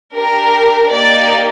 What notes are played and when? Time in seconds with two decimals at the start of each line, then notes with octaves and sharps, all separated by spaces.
0.14 D4 G4 A#4
0.91 A#3 D#4 G4 D5